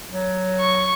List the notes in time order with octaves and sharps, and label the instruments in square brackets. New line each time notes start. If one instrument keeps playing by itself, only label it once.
[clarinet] F#3
[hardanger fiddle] C#6